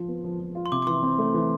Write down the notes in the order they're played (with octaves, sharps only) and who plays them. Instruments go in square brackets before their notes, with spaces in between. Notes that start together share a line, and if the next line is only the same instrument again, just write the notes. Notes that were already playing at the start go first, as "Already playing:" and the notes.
Already playing: [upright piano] F3 F4
B3
F3
F3
F4
[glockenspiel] C6
[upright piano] C3 [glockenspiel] D6
[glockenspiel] D6
[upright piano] E3 [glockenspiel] C6
[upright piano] C4
A3
E3